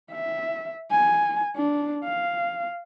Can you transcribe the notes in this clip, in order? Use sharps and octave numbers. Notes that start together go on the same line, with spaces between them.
E5
G#5
D4
F5